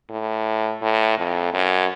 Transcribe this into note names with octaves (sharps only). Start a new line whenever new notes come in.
A2
A2
F2
F#2